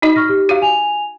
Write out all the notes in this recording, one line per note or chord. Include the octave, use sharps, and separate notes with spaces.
D#4 F#4 D#5
C#6 F6 A#6
G4
F#4 F5
G#5 F7